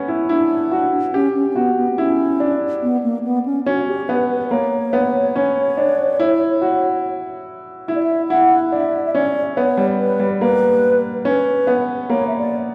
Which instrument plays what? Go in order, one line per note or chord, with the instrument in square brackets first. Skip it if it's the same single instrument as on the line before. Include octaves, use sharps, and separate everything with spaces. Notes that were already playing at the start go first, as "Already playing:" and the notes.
Already playing: [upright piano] B3 C#4
E4
[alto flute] D4 [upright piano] E4
[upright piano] F#4
[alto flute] C#4 [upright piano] G4
[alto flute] C#4
C#4
[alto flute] B3 [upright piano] F#4
[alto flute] B3
B3
[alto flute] C#4 [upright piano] E4
[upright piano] D4
[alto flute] B3
A#3
B3
C#4
[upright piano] C#4 [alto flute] F#4
[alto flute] G4
[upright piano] B3 [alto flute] B4
[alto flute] B4
[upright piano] A#3 [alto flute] C#5
[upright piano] B3
C#4
D4
E4
F#4
[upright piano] E4 [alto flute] E5
[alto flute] D5
E5
[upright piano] E4 [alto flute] F#5
[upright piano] D4 [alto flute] E5
[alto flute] E5
[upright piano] C#4 [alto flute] D5
[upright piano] B3 [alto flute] C#5
[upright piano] G3
[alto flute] B4
[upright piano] G3
[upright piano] A#3 [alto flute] B4
[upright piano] C#4 [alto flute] B4
[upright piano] B3
[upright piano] A#3 [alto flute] C#5
[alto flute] E5
D5